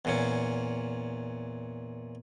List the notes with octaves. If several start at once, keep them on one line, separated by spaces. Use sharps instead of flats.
E2 A#2 C#4